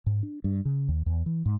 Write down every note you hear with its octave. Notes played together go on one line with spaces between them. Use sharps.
G#2
D4
G2
C#3
D#2
E2
E3
G#2